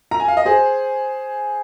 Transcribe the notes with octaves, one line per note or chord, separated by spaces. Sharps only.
A#5
G#5
F5
D#5
G#4 C5